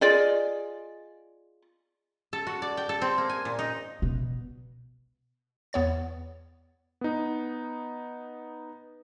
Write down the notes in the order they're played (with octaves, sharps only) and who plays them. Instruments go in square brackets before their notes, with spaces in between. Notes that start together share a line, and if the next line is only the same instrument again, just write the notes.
[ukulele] F4 G#4 D5 D#5
[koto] A4
F#4
D5
G5
A4
C4
A#3
G#5
A#2
D#4
[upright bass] B2
[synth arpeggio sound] E2 B3 C#5 A6
[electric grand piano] B3 D#4